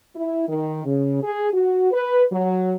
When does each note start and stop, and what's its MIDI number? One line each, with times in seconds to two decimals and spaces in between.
0.16 0.43 64
0.48 0.83 51
0.85 1.21 49
1.22 1.49 68
1.52 1.88 66
1.91 2.23 71
2.31 2.75 54